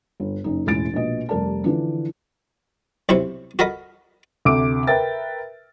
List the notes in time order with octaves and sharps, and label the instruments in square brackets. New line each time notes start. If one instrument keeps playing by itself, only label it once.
[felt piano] G1
F#1 D#4
E1 A1 G#3 E4 A6 D7
A#1 B2 D#5
F1 G3 A#4 D5 A5
D3 E3 F3 D4
[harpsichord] B1 C3 E4 C5 C#6
F#4 A4 A#4 D#5 B5
[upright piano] D2 C3 D6 D7
A#4 B4 E5 G5 A6